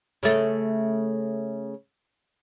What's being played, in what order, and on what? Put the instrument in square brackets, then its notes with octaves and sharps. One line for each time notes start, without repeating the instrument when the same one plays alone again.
[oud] C#3 A3